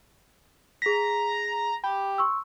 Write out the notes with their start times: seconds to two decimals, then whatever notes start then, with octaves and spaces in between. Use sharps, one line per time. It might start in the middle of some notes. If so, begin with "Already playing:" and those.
0.82 G#4 A#5 B6
1.84 G4 B5
2.18 C6 C#6 E6